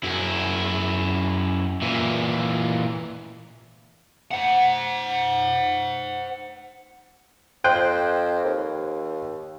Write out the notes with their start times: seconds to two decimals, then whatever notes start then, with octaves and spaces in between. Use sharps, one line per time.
0.03 F#2 E4
1.83 A#2 E3
4.31 C5 F#5
7.64 F2 C5 G5 F#6
8.45 D#2